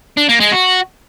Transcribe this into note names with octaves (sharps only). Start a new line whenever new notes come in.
D4
A#3
G#3
F#4